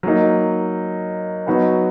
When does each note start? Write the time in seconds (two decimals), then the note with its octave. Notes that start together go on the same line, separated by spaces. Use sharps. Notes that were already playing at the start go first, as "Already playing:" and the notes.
0.03 F#3 A#3 D#4
1.47 F#3 B3 D#4 F#4 B4